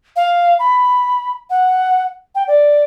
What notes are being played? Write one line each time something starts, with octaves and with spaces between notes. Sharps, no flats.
F5
B5
F#5
G5
D5